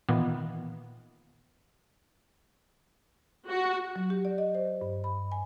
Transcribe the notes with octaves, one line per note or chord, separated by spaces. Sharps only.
A#2 D#3 E3 A#3 B3
F#4
F#3
G4
D5
D#5
C5
G2
B5
G#5